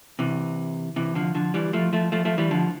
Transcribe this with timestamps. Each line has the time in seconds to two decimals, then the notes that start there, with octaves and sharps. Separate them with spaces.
0.19 C3 E3
0.96 C3 E3
1.15 D3 F3
1.35 D3 F3
1.54 E3 G3
1.73 F3 A3
1.93 F3 A3
2.12 F3 A3
2.25 F3 A3
2.38 E3 G3
2.51 D3 F3